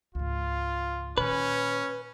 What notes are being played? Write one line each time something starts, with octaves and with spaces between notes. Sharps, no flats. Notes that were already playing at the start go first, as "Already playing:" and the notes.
C#2 G#2 F4
A#2 D#3 C#4 B4